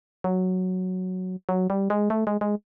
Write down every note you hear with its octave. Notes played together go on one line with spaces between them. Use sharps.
F#3
F#3
G3
G#3
A3
G#3
G#3